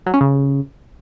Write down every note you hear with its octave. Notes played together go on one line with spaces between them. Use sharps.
F#3
C#4
C#3